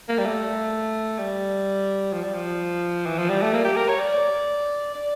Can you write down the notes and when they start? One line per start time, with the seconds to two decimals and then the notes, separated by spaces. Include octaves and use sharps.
0.09 A#3
0.18 G3
0.25 A3
1.18 G3
2.13 F3
2.24 G3
2.34 F3
3.06 E3
3.19 F3
3.30 G3
3.42 A3
3.54 A#3
3.65 G4
3.76 A#4
3.89 C#5
4.00 D5
4.95 D5